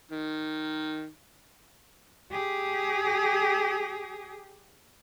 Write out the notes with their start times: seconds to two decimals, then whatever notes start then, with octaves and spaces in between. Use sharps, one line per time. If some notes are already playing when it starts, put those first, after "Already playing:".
0.12 D#3
2.31 G4 G#4